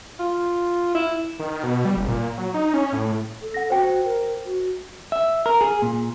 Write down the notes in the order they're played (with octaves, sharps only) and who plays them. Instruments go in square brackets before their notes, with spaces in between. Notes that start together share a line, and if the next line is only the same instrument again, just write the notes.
[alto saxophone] F4
E4
[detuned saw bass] D#3
B2
G3
F#1
A#2
F#3
D#4
C#4
A2
[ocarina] A4
[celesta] F#5 A#6
[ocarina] F#4 [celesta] C5 G5
[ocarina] A#4
F#4
[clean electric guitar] E5
A#4
G#4
A#2